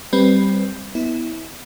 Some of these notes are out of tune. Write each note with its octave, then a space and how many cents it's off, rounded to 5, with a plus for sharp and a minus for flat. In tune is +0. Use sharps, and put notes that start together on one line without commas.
G3 +0 C4 +10 B4 +0
B3 +0 E4 -30